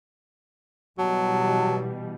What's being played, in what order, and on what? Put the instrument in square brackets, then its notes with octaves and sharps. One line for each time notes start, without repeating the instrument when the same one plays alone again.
[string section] B2 E3 G3 [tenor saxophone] F#3 [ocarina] A5